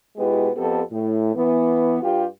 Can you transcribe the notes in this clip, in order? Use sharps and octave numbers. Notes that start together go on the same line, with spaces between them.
B2 G#3 B3 E4 G4
F2 B3 G4 A4
A2
E3 B3
G2 F4 G4